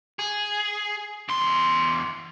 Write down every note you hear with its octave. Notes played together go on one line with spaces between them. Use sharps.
G#4
E2 C6